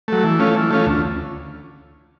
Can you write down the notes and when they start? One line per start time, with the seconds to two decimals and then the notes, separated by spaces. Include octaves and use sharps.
0.08 F#3 A3
0.24 E3
0.39 A3 C#4 F4
0.55 E3
0.71 A3 C#4 F4
0.86 D2